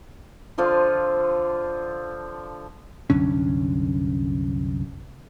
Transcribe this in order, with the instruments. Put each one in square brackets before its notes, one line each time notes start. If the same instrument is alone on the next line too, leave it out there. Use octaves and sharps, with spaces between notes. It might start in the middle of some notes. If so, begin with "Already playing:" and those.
[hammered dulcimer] D3 F3 F4 F5
[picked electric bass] C2 F#2 D3 C#4